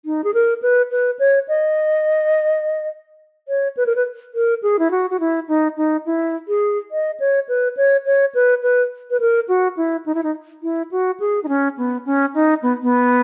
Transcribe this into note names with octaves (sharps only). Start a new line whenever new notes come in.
D#4
G#4
A#4
B4
B4
C#5
D#5
C#5
B4
A#4
B4
A#4
G#4
E4
F#4
F#4
E4
D#4
D#4
E4
G#4
D#5
C#5
B4
C#5
C#5
B4
B4
B4
A#4
F#4
E4
D#4
E4
D#4
E4
F#4
G#4
D#4
C#4
B3
C#4
D#4
B3
B3